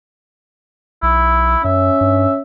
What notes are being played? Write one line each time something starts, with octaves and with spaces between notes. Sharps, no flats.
B1 E4
F#2 C#4 E5
G2